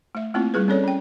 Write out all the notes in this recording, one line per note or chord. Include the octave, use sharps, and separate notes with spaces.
A3 E5
A3 A#3 C4 E4 F4
G3 E4 G#4 B4
C4 C#4 A4 C#5 D5
C#4 G5